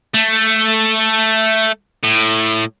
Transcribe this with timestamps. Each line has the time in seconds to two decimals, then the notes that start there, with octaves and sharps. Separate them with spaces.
0.14 A3
2.03 A2